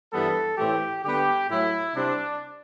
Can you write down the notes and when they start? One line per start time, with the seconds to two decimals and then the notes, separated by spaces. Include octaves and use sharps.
0.12 G2 E3 G3 B3 A4
0.58 A2 E3 A3 C4 G4
1.04 D3 G3 B3 G4
1.49 A2 F#3 A3 E4
1.95 C3 G3 C4 D4